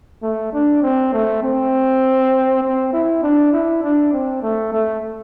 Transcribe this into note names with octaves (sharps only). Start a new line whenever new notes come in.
A3
D4
C4
A3
C4
C4
E4
D4
E4
D4
C4
A3
A3